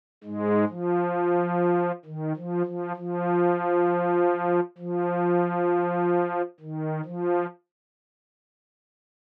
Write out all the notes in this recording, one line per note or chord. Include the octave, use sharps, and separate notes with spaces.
G#2 G#3
F3
D#3
F3
F3
F3
F3
D#3
F3